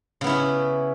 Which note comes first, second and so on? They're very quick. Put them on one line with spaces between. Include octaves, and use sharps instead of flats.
C#3 B3 E4 C#4